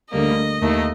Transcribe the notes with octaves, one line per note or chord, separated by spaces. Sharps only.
D2 D3 G3 A#3 D#5
D#2 D#3 A3